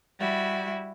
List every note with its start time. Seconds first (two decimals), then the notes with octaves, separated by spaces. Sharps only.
0.18 G3 E4 F#4